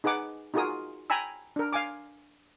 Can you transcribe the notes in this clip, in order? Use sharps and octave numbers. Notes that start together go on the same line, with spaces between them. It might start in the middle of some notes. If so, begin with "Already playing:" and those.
D#4 G#4 B4 F#5 D6
D#4 F4 F#4 G#4 A#4 D#6
G5 G#5 A#5 B5 E6
D4 A#4
F5 G#5 D6